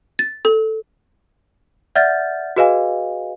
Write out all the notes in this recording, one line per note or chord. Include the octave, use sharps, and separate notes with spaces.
A6
A4
D5 E5 F#5 F6 G6 A6
F#4 G#4 B4 D#5 F5 G#5